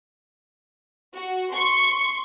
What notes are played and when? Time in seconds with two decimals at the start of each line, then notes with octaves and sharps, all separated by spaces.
1.13 F#4
1.53 C6 C#6